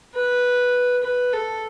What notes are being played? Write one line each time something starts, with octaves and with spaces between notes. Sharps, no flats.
B4
B4
A4